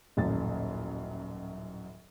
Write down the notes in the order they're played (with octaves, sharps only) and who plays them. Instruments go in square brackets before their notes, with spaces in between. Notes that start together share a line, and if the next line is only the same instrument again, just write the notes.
[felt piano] D#1 A1 F#2 A6